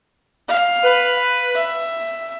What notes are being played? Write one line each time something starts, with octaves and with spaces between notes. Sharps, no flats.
F5
B4
E5